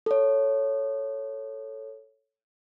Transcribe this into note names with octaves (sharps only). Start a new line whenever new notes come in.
A4 C#5